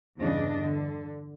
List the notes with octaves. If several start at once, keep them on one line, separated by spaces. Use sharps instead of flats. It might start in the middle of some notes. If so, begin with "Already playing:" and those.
E2 G2 C#3 E3 D4 D#5
D3